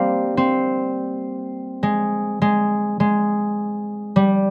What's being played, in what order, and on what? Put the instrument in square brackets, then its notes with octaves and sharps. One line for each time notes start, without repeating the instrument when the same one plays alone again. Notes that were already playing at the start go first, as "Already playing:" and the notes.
Already playing: [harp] G3 A#3 C4
C4
G#3
G#3
G#3
G3